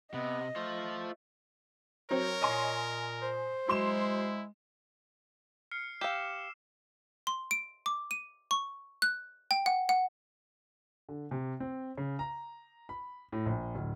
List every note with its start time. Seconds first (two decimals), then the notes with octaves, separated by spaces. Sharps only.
0.14 C3 B3 D#5
0.56 A3 F4 C5
2.10 F#3 C4 A#4 C#5
2.41 A#2 D#5 G#5 C6
3.22 C5
3.68 F#3 G#3 E4 C6 E7
5.71 F6 C7 C#7
6.01 G4 F5 D6 E6 E7
7.27 C6
7.51 D7
7.86 D6
8.11 D#7
8.51 C#6
9.02 F#6
9.51 G5
9.66 F#5
9.89 F#5
11.09 D3
11.31 C3
11.60 C4
11.98 C#3
12.19 A#5
12.89 B5
13.32 A2
13.46 A#1
13.75 D1